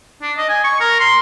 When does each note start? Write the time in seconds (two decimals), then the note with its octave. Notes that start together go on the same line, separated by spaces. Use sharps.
0.22 D4
0.37 D#5
0.49 G#5
0.64 C#6
0.80 A#4
1.00 C6